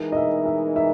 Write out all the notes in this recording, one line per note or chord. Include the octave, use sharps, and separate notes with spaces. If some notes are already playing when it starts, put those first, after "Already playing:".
Already playing: E3 G#3 D#4 A#4
D#5
E5
E5
E5